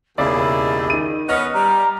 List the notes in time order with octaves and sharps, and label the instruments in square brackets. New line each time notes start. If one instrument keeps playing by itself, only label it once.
[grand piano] E1 C#3 D5 [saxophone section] D#2 E4 G#4 [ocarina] D#5
[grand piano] D#3 D#7
[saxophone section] B3 C#4 B4 [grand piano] D#5 F6
[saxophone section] G3 [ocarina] A#5